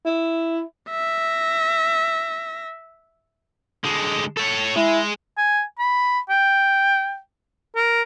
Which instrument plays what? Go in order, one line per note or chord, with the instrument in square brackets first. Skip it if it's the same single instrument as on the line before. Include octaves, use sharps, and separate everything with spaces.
[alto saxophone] E4
[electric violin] E5 A#6
[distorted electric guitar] D3 G#3
A4 C#5
[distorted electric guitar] G#3 [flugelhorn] E4
[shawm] G#5
B5
G5
A#4